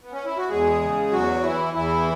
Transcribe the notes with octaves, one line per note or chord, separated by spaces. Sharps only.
B3
C#4
E4
F#4
E2 G#3 G#4
C#3
E2 F#3 F#4
E3 E4
E2 E3 E4